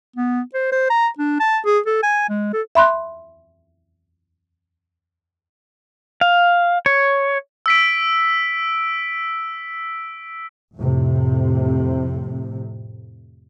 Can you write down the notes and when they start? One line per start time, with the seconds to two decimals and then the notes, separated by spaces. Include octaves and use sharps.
0.16 B3
0.54 C5
0.72 C5
0.90 A#5
1.18 D4
1.40 A5
1.66 G#4
1.86 A4
2.03 G#5
2.29 G#3
2.53 A4
2.75 E5 B5 C6 F#6
6.21 F5
6.86 C#5
7.66 E6 B6 D7
10.77 F2 A2 C3